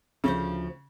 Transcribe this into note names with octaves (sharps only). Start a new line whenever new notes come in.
D2 C#3 F3 C5